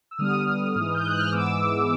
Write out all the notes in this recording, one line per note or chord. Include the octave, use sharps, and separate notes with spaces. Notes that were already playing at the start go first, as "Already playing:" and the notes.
E6
D3 G3 B3 D#6 F6
G#2 E3 G#3
G6
F#6
F6
G#2 E3 G#3 B3 D6 E6